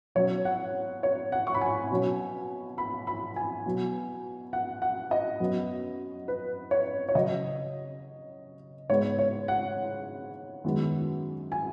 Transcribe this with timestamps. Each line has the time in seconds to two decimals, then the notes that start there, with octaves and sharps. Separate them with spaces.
0.15 B2 F#3 C#4 C#5
0.45 F#5
1.03 C#5
1.32 F#5
1.47 C#6
1.54 B5
1.61 G#5
1.90 B2 F#3 C#4
2.78 B5
3.07 B5
3.36 G#5
3.65 B2 F#3 B3
4.53 F#5
4.82 F#5
5.11 D#5
5.40 F#2 F#3 B3
6.28 B4
6.71 C#5
7.09 C#5
7.15 C#3 F#3 C#4 D#5
8.89 G#2 G#3 B3 C#5
9.19 C#5
9.48 F#5
10.64 F#2 D#3 G#3 B3
11.52 G#5